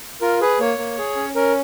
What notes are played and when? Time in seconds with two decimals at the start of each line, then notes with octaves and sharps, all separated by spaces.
0.21 F4 A#4
0.41 G#4 B4
0.60 A#3 C#5
0.78 A#3
0.98 G#4
1.16 C#4
1.35 C#4 A#4